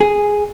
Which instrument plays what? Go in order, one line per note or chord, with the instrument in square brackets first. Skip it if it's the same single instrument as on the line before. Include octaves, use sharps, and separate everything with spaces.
[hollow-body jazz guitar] G#4